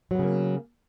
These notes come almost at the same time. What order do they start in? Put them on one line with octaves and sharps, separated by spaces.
F#3 B3 C#3 A#3